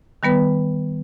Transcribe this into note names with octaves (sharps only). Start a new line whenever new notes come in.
D#3 G3 B3 B4